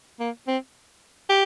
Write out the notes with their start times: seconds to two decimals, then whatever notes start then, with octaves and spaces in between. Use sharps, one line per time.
0.20 A#3
0.48 C4
1.30 G4